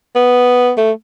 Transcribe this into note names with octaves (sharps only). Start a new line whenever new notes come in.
B3
A3